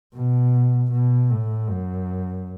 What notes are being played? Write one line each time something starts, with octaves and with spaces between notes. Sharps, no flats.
B2
B2
A2
F#2